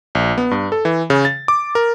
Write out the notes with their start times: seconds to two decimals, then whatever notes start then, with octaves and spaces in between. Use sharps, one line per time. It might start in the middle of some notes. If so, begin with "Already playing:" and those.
0.15 A#1
0.38 B3
0.51 G2
0.72 A4
0.85 E3
1.10 C#3
1.25 A6
1.48 D6
1.75 A#4